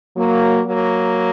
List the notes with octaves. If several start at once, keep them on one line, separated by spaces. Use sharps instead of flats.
F#3 A#3
F#3 A#3